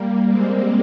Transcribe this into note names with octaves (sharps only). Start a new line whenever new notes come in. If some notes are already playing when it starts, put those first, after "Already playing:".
Already playing: G3 A#3
G#3 C4